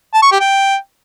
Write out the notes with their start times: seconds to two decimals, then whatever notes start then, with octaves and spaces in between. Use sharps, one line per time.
0.14 A5
0.23 C#6
0.31 G4
0.40 G5